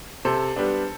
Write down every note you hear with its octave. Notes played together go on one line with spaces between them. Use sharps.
C3 A4 C5
G3 B3 D4